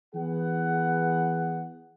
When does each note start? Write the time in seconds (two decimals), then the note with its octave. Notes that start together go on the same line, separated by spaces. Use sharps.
0.15 E3 B3 G#4 F#5